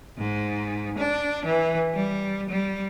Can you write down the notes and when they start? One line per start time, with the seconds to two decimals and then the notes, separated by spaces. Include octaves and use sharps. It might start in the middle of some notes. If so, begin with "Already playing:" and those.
0.16 G#2
0.97 D4
1.45 E3
1.93 G3
2.48 G3